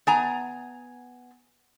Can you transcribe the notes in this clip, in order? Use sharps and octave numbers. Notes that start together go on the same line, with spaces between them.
B3 G#5 A#5